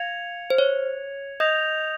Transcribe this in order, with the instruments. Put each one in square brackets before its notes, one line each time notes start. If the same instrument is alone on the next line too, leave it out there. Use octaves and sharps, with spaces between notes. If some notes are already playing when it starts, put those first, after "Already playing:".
Already playing: [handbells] F5 [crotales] G#6 C#7 F7
[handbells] C5
C#5
[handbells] D#5 [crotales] D#6 G6 A#6 F7